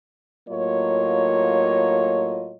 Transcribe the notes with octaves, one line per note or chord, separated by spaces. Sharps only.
A2 F#3 A#3 F4 C#5 D#5